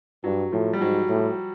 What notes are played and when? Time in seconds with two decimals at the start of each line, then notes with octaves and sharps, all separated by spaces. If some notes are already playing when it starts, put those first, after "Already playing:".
0.24 G2 F#3
0.52 A2 F3
0.73 G3
0.81 G#2 F#3
1.09 A2